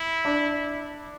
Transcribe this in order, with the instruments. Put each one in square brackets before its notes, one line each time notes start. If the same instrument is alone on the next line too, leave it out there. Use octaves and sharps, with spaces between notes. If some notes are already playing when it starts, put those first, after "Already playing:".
Already playing: [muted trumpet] E4
[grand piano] D4